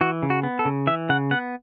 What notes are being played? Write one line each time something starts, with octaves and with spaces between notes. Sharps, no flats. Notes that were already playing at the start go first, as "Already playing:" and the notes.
E3 F#4
C#3
F#4
B3
A4
C#3
E3 E5
C#3 F#5
B3 F#5